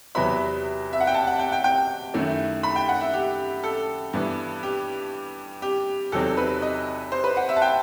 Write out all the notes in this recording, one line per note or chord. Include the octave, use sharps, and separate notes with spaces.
E2 C3 F#3 B3 E4 B5
E5
F#5
G5
A5
F#5
G5
G5
G5
F#2 D#3 A3 E4
B5
G5
F#5
E5
G4
A4
G2 E3 B3
G4
G4
E2 C3 F#3 C4 D#4 A4
B4
D#5
C5
B4
F#5
E5
A5
G5